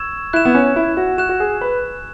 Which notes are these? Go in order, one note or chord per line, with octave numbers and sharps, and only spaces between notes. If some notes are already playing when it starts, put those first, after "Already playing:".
Already playing: C#6 E6 G#6 E7
E4 F#6 E7
B3
C#4
E4
F#4
F#4 F#6 E7
F#4
G#4
B4